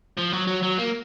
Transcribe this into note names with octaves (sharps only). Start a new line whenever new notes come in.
F3
F#3
F#3
F#3
A#3